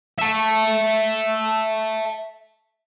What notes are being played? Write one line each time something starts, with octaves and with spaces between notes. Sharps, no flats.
E5 A5